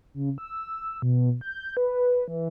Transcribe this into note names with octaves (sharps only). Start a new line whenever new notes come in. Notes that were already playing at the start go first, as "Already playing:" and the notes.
C#3
E6
B2
G6
B4
E3